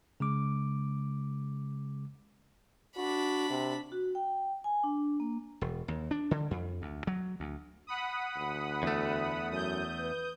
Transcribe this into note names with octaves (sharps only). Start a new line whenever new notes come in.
C#3 G#3 D6
D4 F#4 B5
C3
F#4
G5
G#5
D4
A#3
E1
D#2
D4
D3
F2
D2
F#3
D2
F#5 B5 D#6
D2
E2 A3
F#2 D#6 G6
B4